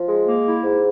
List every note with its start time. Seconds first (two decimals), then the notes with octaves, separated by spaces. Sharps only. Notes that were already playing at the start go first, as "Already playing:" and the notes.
Already playing: F3
0.08 G#3
0.27 A#3
0.46 E4
0.63 G#2